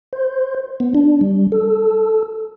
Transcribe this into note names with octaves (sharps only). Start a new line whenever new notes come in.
C5
B3
D4
G3
A4